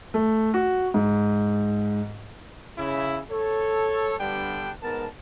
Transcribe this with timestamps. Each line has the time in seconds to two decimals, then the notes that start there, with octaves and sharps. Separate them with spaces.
0.14 A3
0.54 F#4
0.94 G#2
2.78 C#3 E4
3.31 A4 C#5
4.20 G2 D3 G3 B3 D4 G5
4.83 G#2 B3 A#4 A5